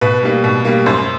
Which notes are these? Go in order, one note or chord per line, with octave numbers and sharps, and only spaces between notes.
B2 B4
G3 A#3
B2
G3 A#3
F#2 C5